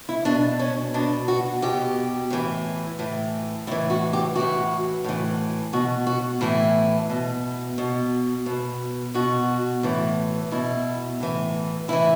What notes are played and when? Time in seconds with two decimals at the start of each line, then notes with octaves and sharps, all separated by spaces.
0.09 E4
0.25 B2 D4
0.59 C#4
0.94 B2 D4
1.28 F#4
1.62 B2 G4
2.30 A2 E3
2.99 A2 E3
3.67 A2 E4
3.71 E3
3.90 F#4
4.13 G4
4.35 A2 E3 F#4
5.04 A2 E3
5.73 B2 F#4
6.07 F#4
6.41 A2 E3 E4
7.10 B2
7.78 B2
8.46 B2
9.14 B2 F#4
9.83 A2 E3
10.51 B2 E4
11.20 A2 E3
11.88 A2 E3 E4